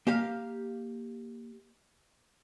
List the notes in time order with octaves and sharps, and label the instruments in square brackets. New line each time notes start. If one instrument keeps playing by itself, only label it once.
[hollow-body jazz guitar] A#3 G4 F5